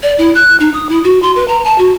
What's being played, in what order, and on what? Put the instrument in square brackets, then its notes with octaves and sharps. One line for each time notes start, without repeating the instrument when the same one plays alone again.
[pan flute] D5
E4
F#6
D#4
D#6
E4
F#4
C6
B4
A#5
A5
F#4